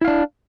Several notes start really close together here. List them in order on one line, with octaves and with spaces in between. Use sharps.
E4 F5 D4